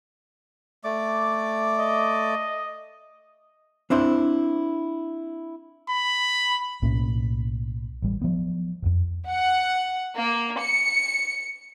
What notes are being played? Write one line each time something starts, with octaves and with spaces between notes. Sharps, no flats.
A3 D5 D6
D#5
C4 D4 E4 C5
B5
B1 A2 A#3 C#4
A1 G3
F3 F#3 B3
E1 F2
F#5
A#3
C#7